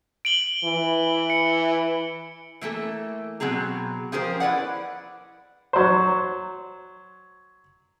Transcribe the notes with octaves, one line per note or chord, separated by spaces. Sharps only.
D7 F#7 G7
E3
C#7
E3 A3 A#3 A4
B2 F#3 C4 G#4 A#5
F3 C#4 G4 G#4 A#4 C5
E4 B4 D5 F#5
F#3 C5